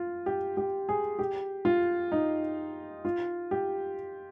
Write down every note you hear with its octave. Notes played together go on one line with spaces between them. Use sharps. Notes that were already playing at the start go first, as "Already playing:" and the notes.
Already playing: F4
G4
G4
G#4
G4
F4
D#4
F4
G4